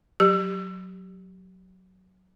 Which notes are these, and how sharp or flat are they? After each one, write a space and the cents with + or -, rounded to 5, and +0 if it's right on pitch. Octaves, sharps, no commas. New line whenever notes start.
F#3 +0 G4 +0